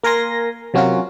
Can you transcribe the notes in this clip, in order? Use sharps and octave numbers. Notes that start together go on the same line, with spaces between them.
A#3 A#4 G#5 C6 A#6
C3 F#3 C#4 F4 F#4 A#4